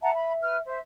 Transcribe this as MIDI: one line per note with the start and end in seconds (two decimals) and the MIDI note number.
0.02 0.62 76
0.02 0.11 78
0.02 0.11 81
0.02 0.11 82
0.15 0.34 83
0.41 0.57 71
0.41 0.57 89
0.66 0.78 72
0.66 0.78 76